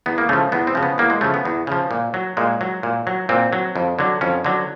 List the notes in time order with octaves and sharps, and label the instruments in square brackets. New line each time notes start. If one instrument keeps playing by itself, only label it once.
[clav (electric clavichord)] E2 B3
A#3
C#3 F3 A3
E2 B3
C4
C#3 F3
B3
E2 A#3
G#3
C#3 F3 A3
B3
E2
C#3 F3
A#2
F#3
A#2 G#3
F#3
A#2
F#3
A#2 C4
F#3
F2
D3 F#3
F2 C#4
D3 F#3